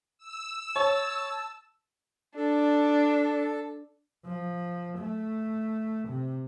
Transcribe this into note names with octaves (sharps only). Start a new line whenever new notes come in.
E6
C#5 A5
D4 A4
F3
A3
C3